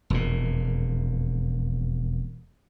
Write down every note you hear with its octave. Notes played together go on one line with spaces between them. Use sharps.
E1 F2 A#2